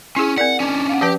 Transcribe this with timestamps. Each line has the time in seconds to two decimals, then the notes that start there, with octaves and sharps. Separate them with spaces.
0.16 C#4 E4 G#4
0.38 C4 A#4 D5 F#5
0.60 C#4 D4
0.89 F5 F#5
1.01 F3 C#4 G4 B4